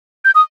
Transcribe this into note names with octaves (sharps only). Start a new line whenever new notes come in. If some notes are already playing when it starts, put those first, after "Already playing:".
G6
D#6